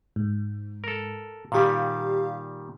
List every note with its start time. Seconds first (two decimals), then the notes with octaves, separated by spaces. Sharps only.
0.16 G#2
0.84 A4 A#4
1.52 A#2 D#3 G3 G4 F5